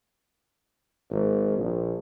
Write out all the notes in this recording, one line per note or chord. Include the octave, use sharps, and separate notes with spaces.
G#1
A#1